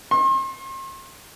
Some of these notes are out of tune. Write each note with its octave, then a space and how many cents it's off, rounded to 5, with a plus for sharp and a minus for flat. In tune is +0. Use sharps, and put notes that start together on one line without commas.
C6 +40